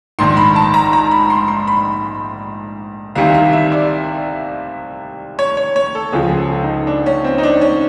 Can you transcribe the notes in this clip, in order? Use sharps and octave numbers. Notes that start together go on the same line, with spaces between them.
A#1 G#2 D#3 C6
B5
A5
A#5
A#5
B5
C6
C6
B5
C2 C3 D#3 F5
F5
E5
D5
C#5
C#5
C#5
A4
C#2 C#3 F3 G#4
G#4
A4
D#4
D4
C#4
C4
D#4
D4
C#4